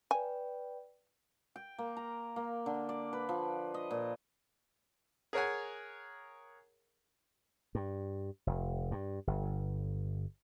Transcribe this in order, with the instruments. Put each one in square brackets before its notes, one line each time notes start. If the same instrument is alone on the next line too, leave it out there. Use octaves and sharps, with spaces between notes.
[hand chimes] B4 D5 G5 [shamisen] G#5
[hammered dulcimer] G5
A#3
A#5
A#3
D3
D5
B4
F3
D#5
A#2
[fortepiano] G#4 A#4 C#5 F#5 G#5
[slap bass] G2
F1
G2
G1